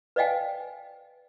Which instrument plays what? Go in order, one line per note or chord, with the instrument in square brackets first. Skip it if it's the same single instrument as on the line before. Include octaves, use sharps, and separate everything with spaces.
[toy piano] B4 D5 D#5 F5 G5 G#5